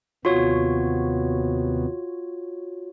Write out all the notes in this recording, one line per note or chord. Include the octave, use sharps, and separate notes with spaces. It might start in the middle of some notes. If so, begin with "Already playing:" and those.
D#2 C3 B3 F4 F#4 C#5